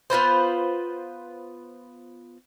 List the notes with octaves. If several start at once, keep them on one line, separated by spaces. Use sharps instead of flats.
B3 F4 B4 C5